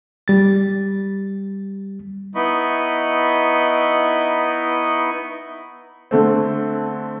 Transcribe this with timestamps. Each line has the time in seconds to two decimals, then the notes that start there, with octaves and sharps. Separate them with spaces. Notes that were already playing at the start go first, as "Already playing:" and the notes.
0.28 G3 A6
2.35 B3 D#4 E4 D#5 B5 C#6
6.11 D3 A3 C4